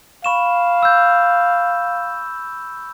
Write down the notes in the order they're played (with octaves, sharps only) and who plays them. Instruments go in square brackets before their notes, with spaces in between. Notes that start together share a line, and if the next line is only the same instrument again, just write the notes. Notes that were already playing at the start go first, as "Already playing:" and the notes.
[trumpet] F5 [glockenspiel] B5 C#6 E7
[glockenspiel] E6 G6